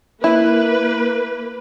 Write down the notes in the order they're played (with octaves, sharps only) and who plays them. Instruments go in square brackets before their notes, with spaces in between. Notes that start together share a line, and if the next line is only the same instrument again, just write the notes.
[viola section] A#3 B4 [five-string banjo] E4